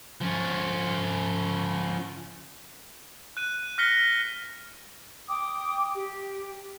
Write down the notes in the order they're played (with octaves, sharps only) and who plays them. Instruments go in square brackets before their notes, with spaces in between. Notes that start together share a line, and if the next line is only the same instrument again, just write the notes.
[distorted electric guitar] F3 C#4
[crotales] F#6 D#7
F6 F#6 A#6 B6 C#7 G7
[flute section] G5 D6 D#6
G4